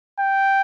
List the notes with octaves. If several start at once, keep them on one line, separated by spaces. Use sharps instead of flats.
G5